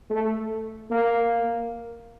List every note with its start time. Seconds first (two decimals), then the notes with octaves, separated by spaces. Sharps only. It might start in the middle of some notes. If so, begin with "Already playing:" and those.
0.10 A3
0.91 A#3